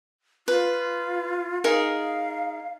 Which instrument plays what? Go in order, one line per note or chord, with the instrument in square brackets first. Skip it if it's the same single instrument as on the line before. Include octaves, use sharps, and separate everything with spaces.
[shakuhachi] F4 [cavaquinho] B4
[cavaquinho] D#4 G#4 A#4 [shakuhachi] F5